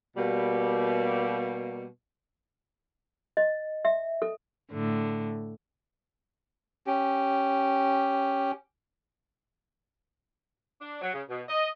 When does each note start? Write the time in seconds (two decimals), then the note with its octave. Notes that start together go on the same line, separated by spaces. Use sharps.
0.17 B2 G3 A#3
3.37 D#5
3.85 E5
4.22 A4
4.71 A2 D3
6.87 C#4 G4
10.80 D4
11.01 F#3
11.13 C#3
11.29 B2
11.49 D#5